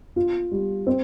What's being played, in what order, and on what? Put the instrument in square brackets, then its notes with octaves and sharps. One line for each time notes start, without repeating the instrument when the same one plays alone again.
[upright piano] F4
G3
C4